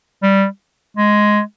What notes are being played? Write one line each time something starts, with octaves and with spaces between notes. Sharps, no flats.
G3
G#3